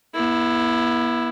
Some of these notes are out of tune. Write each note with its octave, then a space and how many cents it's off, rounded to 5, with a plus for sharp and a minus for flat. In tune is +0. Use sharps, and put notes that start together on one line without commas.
B3 -35 E4 +0